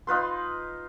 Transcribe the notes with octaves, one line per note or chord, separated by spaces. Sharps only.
D#4 F4 B4 C6